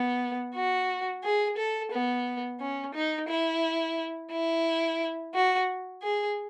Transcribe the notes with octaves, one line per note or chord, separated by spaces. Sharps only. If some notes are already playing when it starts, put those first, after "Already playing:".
Already playing: B3
F#4
G#4
A4
B3
C#4
D#4
E4
E4
F#4
G#4